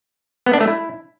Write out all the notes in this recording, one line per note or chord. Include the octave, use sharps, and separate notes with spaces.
B3
D4
A3
E4